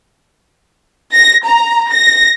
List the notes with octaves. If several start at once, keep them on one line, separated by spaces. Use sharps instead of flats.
A#6
A#5
A#6